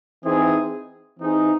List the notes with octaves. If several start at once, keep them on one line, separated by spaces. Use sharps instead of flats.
E3 C4 D#4 G#4
E3 C4 D#4 G#4